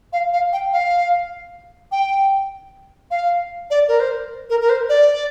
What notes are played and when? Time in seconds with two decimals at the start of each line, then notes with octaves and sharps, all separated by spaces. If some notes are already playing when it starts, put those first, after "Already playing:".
0.13 F5
0.33 F5
0.53 G5
0.73 F5
1.92 G5
3.11 F5
3.70 D5
3.88 A#4
4.00 C5
4.50 A#4
4.61 A#4
4.70 C5
4.89 D5